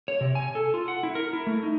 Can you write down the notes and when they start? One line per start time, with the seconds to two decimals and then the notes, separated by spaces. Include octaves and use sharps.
0.08 C#5
0.21 C3
0.35 G#5
0.55 A4
0.74 F4
0.88 F#5
1.03 E4
1.15 A#4
1.33 E4
1.47 A3
1.63 D#4